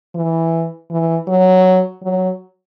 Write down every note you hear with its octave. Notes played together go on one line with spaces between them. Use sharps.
E3
E3
F#3
F#3